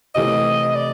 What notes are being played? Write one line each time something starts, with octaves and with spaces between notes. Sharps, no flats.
C3 E3 A3 D#5
D5